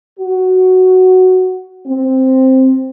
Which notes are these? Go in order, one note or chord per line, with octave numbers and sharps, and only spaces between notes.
F#4
C4